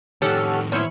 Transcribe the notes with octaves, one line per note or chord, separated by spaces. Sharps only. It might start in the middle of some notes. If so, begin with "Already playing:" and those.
A2 D#3 C#4 G4 A4 F#5
B3 C#4 E4 C5 C#7